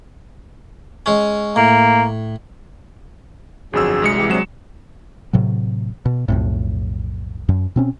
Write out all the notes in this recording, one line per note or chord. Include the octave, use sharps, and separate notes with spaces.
G#3 C#4
A2 A#3
G1 F2 F#3 D4 G#4 E6
C2 G#3 C#7
E3 E4 G4
C3 F#3 G#3 D4 E7
A2 C3 F#3
B2
B1 F2 A2
F#2
B2 C4 C#4